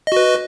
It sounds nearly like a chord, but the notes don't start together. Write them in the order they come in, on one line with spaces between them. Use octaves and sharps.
D#5 F#4 B4